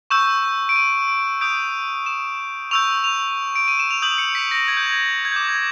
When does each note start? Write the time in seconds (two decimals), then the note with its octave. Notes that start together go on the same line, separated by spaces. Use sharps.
0.10 C#6 E6 G6 E7
0.69 D7
0.76 D#7
1.08 D7
1.41 D#6 G6 D7
2.06 E7
2.71 C#6 E6 G6 F7
3.04 F7
3.56 D7
3.68 D#7
3.79 E7
3.90 F7
4.02 D#6 G6 F#7
4.18 C#7
4.35 B6
4.51 A#6
4.68 G#6
4.77 G6
4.86 G#6
5.25 G#6
5.32 D6 G6
5.49 G#6